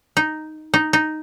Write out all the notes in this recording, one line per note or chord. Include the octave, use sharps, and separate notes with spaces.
D#4
D#4
D#4